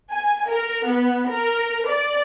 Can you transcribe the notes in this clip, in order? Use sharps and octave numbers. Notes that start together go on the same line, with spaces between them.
G#5
A#4
B3
A#4
D5